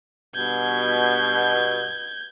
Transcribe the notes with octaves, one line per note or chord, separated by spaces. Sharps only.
G2 B2 G6 G#6